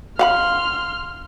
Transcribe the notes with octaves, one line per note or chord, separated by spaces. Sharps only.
F5 F#5 B5 C6 F6